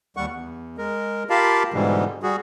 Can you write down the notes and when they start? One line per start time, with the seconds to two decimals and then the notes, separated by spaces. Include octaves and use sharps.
0.17 D#2 G3 F#5 C#6
0.31 E2
0.78 G#3 A#4
1.30 F4 G4 A#4 F5 A5 B5
1.74 G#2 B2 D3 E3 G3 G#3
2.23 G3 F#4 G#4